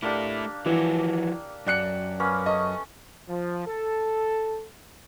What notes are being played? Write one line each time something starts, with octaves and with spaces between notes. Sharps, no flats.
A3 A#3 D4 E4 G4
E3 F3 F#4 E6
F#2 D5 G5 F#6 C#7
A#3 B3 C#4
A3 D#5 D#6
F3
A4